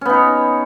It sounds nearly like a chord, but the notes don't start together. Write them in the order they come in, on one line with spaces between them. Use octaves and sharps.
C#4 B3 D#4 C#5